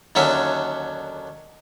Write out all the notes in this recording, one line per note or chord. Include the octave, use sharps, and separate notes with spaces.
D#2 D3 F#3 C#4 E5